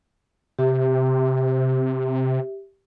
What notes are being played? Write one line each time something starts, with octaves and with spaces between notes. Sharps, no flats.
C3 G4 E5